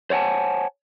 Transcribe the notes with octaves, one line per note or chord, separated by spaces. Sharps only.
C5 C#5 F#5 G#5 A5